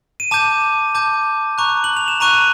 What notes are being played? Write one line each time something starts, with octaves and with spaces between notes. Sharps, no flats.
D#7
A5 D6 G6 E7
A5 D6 G6
A#5 C#6 F#6
F#7
F7
E7
A#5 C#6 F#6 D#7